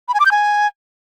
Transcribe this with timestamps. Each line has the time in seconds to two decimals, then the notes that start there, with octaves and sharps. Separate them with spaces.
0.08 B5
0.14 G#5
0.20 D6
0.26 G6
0.31 G#5